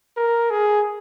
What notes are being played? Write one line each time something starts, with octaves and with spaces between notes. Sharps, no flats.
A#4
G#4